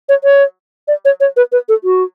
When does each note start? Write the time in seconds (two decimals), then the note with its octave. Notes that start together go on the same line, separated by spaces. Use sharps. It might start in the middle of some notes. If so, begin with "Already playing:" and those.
0.09 C#5
0.24 C#5
0.88 D5
1.05 C#5
1.20 C#5
1.37 B4
1.52 B4
1.69 A4
1.84 F#4